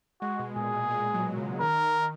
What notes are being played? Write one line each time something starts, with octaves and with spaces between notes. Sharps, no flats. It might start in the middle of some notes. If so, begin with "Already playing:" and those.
G#3 F#4
B2
A#2 G#4
A#2
G#3
F#3
C#3
D#3 A#4
D#3